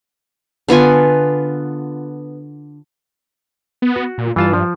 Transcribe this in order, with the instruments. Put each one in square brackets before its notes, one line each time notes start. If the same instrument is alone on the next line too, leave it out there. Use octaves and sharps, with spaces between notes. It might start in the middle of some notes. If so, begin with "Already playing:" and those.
[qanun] D3 B3 F4 G#5
[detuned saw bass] B3
[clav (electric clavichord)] F#4
[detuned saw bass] A#2
[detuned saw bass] G2 [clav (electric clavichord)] E3 F4 A5
[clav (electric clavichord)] F3